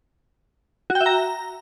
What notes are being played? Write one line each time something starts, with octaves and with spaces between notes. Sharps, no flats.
F#4
G5
E5
A#5